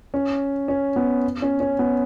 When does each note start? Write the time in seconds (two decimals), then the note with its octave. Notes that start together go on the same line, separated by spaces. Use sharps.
0.14 C#4
0.68 C#4
0.96 B3
1.42 C#4
1.60 C#4
1.79 B3